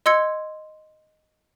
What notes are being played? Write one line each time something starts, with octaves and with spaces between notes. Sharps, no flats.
D#5 C6 E6 G#6 C#7